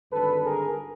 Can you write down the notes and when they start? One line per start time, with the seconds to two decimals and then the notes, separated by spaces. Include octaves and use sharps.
0.11 G#1 G2 D3 A4 B4
0.45 G#4 A#4